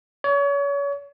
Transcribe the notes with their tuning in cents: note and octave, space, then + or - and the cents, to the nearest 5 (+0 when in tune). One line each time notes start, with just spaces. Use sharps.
C#5 +35